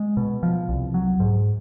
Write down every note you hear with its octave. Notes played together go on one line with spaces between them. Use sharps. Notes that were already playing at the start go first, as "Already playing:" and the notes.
Already playing: G#3
B2
F3
C2
F#3
G#2